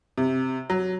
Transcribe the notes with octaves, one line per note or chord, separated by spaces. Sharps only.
C3
F#3